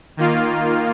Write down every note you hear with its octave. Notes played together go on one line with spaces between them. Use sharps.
D#3 A#3 F4